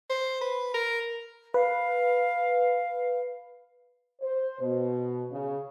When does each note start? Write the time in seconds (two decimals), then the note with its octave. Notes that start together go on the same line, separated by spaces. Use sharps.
0.10 C5
0.41 B4
0.74 A#4
1.54 B4 F5
4.21 C5
4.60 B2
5.31 C#3